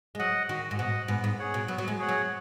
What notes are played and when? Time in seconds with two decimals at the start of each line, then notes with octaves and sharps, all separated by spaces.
0.15 G#3
0.19 F#3 D#5 F#5
0.49 D#3 F#4
0.71 G#2
0.79 B2 D#5 F#5
1.08 G#2 B3
1.24 G#2
1.39 G#4 C#5 F#5
1.54 B2
1.68 F#3 B3
1.78 F#3
1.88 G#3
1.99 G#4 C#5 F#5
2.09 F#3